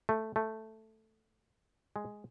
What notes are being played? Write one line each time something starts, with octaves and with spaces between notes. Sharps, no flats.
A3
A3
G#3